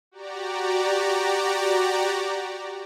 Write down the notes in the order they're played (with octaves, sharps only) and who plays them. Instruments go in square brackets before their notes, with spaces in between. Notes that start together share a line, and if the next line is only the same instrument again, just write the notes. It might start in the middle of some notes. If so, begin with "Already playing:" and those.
[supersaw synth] F#4 G4 D5 A#5